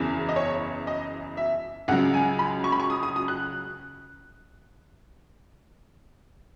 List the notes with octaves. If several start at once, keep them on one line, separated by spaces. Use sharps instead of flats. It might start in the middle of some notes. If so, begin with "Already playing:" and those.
Already playing: F#1 E2 C#3 E3
D#5
C#5
D#5
E5
C#2 C#3 F#3 F#5
G#5
B5
C#6
B5
C#6
D#6
D#6
D#6
F#6